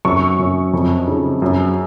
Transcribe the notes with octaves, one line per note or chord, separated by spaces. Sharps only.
F#2 C#6
F#2
F2
C#3
F#2